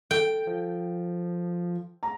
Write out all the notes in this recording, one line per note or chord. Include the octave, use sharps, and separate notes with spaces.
A4 G5
F3
A#5